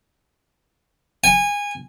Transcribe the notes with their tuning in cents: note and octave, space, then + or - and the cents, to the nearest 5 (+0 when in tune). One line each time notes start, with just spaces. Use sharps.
G#5 -20